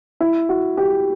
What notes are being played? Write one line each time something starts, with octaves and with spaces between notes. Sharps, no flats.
E4
F#4
G4